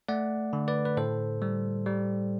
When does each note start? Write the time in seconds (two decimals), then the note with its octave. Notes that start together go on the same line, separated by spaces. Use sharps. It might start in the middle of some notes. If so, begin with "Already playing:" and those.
0.08 A3 D5 F#5
0.53 D3
0.68 B4 D5
0.85 B4
0.97 A2 A4 C5
1.42 G3
1.86 G3